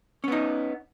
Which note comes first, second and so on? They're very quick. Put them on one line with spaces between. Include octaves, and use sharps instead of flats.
C#4 B3 D#4